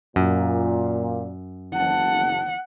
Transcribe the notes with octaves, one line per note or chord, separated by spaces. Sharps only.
F#2 A#2
F#1 F#5 A5